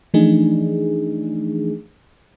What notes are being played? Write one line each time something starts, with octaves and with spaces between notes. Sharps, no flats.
E3 F3 A3 D4 D#4 G#4